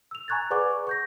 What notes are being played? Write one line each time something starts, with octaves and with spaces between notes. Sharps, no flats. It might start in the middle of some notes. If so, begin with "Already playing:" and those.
E6 F7
G#5 A#5 C#6 F#6 G#6 A6
G#4 B4 D5 F#5 C#6 D6
C#6 G6 A#6